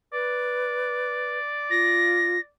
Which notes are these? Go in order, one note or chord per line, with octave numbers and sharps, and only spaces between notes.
B4 D5
F4 A#6